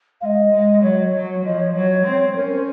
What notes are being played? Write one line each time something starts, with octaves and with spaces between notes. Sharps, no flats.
G#3 D#5 F5
G#3
F#3 C#5
F#3
F3 D#5
C#5
F#3 C#5
C4
C#4 A#4
C5